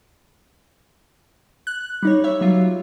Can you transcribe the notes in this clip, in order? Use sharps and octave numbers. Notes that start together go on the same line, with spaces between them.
F#6
G3 D#4 C#5
C#5 E5
F#3 G3 F4